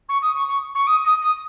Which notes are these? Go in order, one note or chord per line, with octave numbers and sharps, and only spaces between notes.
C#6
D#6
C#6
C#6
C#6
D#6
D#6
D#6